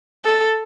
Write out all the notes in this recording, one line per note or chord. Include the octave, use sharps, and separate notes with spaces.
A4